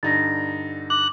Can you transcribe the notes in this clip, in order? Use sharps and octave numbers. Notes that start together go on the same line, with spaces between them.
G2 D3 D#4 A6 A#6
D6 F#6